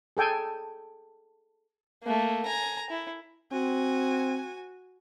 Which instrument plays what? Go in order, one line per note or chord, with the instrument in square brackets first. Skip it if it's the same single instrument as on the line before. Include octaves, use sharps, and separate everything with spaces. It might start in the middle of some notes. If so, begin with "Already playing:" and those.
[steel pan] G#4 A4 G5 G#5
[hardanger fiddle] A3 A#3
G#5 A#5
E4
[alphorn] C4 [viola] F#4 G#5